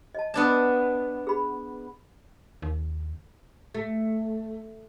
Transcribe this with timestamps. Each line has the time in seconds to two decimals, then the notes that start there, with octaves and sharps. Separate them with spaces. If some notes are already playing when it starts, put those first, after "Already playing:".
0.15 D#5 A5
0.34 B3 D4 D5 A5 D#6
1.27 G#4 B5
2.62 D#2
3.75 A3